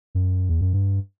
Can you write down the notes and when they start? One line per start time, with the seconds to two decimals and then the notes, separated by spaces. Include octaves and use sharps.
0.15 F#2
0.49 E2
0.61 F#2
0.73 G2